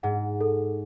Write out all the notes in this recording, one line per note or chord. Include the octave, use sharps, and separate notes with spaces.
G#2 F#5
A4